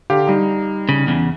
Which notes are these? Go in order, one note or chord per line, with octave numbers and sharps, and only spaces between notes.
D3 G4 F5
G3 D#4
C#3
E2 C#3